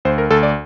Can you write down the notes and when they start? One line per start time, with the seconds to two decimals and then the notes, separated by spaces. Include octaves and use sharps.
0.05 D2 C5
0.18 A#4
0.30 D2 A4
0.43 D5